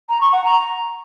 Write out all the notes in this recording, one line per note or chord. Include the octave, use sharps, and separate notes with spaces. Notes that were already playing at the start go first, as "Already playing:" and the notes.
A#5
C#6
F#5
A#5